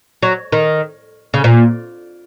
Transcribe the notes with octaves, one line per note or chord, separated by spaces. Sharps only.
F#3
D#3
C#3
A#2